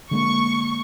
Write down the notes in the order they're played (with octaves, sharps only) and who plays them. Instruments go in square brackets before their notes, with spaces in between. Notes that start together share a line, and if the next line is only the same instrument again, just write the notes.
[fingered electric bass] D3 G#3 A#3 [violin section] C#6